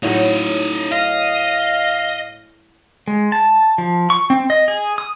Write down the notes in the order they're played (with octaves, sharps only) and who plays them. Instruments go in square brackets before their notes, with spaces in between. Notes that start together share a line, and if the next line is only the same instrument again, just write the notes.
[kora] A2 F#3 F#5 [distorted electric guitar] D#4 F4
[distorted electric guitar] D#5 [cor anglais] F5
[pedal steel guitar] G#3
A5
F3
C#6
C4
D#5
G#4
D#6